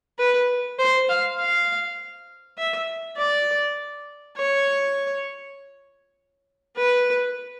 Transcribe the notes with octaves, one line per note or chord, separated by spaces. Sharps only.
B4
C5
F5
F5
E5
D5
C#5
B4